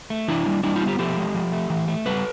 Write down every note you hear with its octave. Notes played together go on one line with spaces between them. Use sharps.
A3
E3 D4 E4
G3
G3 D4 E4
D#4 F4
B3
F4 G4
F3 G4 A4
G#3
F3
A3
E3
A3
G3 A4 B4